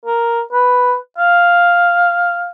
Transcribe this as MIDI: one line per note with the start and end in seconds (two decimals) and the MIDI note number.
0.06 0.41 70
0.53 0.95 71
1.18 2.49 77